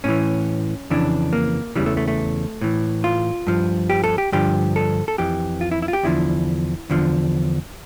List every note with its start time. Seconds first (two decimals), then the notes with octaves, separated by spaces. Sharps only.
0.04 A2 E3 C#4
0.90 F2 C#3 E3 D4
1.33 A#3
1.76 E2 C#3 E3 G3
1.86 A3
1.97 A3
2.08 A3
2.61 A2 E3
3.04 F4
3.47 G2 F3
3.90 G4
4.04 A4
4.18 G4
4.32 G2 D3 F3 G4
4.76 A4
5.08 A4
5.18 F2 E3 G4
5.61 F4
5.71 E4
5.82 E4
5.88 F4
5.93 G4
6.03 E2 D3 F3 E4
6.90 E2 D3 F3